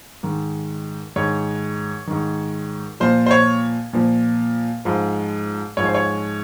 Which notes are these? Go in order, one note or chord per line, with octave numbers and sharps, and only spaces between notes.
G#2 D#3
G#2 D#3 C#5
G#2 D#3
A#2 F3 C5
C5
C#5
A#2 F3
G#2 F3
G#2 F3 C#5
C5
C#5